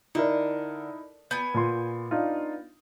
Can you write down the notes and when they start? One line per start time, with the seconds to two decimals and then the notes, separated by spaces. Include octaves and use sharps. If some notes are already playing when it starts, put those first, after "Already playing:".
0.15 D3 D#4 E4 A#4
1.31 B3 G#5 G6
1.54 A#2 C6
2.11 D4 D#4 F4